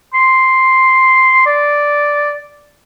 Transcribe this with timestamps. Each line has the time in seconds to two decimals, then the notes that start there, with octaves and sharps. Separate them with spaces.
0.14 C6
1.46 D5